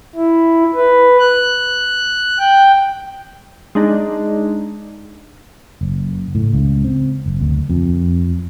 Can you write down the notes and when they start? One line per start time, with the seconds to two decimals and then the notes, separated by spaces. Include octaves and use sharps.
0.16 E4
0.74 B4
1.20 F#6
2.39 G5
3.75 G#3 D4 D#4
5.81 F#1
6.35 A2
6.53 C#2
6.84 C4
7.26 F#1
7.41 D2
7.70 F2